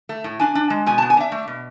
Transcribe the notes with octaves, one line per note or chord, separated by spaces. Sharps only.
A3
A2
D4 G#5
D4
G#3
B2 G#5
B3 A5
G#5
D4 E5
A3
B2